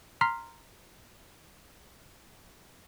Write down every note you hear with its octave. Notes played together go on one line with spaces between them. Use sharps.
A#5 C6 F6 B6 C7